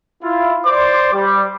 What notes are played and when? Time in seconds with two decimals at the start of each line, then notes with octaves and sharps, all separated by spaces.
0.23 E4 F4
0.66 C5 D5 C6 D6
1.13 G3